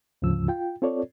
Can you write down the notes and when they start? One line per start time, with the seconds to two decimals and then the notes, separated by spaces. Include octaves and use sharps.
0.22 D2 G#2 C#3 F3 E6
0.48 F4 G5
0.82 C4 F4 A4 C#5 D5